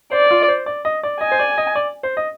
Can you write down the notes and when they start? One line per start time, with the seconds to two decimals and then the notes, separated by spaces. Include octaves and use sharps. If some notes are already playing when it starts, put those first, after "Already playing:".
0.11 C5 D5
0.31 F4
0.48 C5
0.66 D5
0.85 D#5
1.03 D5
1.21 D#5 G#5
1.31 C5
1.39 D5
1.58 D#5
1.75 D5
2.03 C5
2.17 D#5